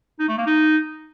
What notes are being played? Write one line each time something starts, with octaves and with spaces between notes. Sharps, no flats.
D#4
A3
A#3
D#4